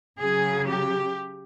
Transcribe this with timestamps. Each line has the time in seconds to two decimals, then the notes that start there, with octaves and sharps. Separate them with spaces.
0.19 C#3 F#3 G#4
0.69 G4